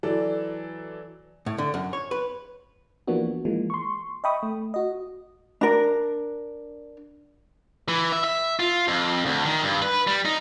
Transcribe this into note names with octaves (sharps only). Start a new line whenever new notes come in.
E3 F#3 A4 D5
A2
D3
F#2
C#5
B4
E3 F3 A#3 B3 D4 F#4
E3 F3 G#3 A#3
C6 C#6
D#5 E5 G5 B5 C#6 D#6
A3
F#4 D#5
D4 A#4
E3
E5
E5
F4
F2
D2
D#3
G2
B4
G3
D#4